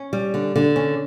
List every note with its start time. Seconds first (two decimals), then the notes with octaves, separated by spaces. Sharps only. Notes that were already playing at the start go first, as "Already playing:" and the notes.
Already playing: C#4
0.13 G3
0.34 D3
0.56 D3
0.76 C#4